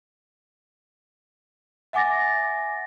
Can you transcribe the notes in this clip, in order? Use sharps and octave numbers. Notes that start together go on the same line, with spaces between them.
E5 F#5 G#5 D6 A6 A#6